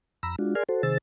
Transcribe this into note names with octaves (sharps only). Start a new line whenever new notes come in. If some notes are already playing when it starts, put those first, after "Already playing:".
F2 A#5 B5 E6
G#3 D4 F4 F#4
G#4 A#4 D5 G#5 C6 F6
F#4 A4 C5
C3 D#3 G#4 C5 E6 A6